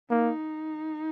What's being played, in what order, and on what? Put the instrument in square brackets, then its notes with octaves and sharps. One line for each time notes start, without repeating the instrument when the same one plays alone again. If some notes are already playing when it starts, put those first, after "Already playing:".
[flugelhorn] A#3 [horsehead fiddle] D#4